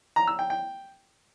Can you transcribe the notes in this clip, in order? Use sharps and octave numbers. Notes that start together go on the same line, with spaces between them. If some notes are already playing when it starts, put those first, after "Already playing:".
A#5
E6
G5
G5